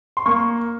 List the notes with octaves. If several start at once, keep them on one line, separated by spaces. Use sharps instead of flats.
C6
A#3 C#6